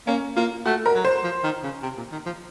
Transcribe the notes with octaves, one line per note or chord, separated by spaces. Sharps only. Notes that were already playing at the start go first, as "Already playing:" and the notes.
A#3 C#4
A#3 F4
A3 F#4
A#4
F#3
C5
F3
D#3
C#3
C3
A#2
D#3
F3